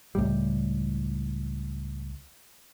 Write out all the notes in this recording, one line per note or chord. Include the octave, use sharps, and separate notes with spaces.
C#2 A2 G3